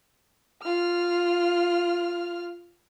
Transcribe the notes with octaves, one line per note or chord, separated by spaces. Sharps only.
F4 F6